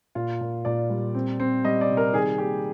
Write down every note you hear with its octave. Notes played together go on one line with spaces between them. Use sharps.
A#2 F4
A#2
A#2 D5
G3
C4
C4
G3 D#5
D5
C3
A#4
D#3 G#4
A#3 G4